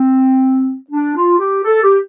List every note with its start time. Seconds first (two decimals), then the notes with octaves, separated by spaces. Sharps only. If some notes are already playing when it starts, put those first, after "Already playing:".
Already playing: C4
0.90 D4
1.15 F4
1.39 G4
1.64 A4
1.82 G4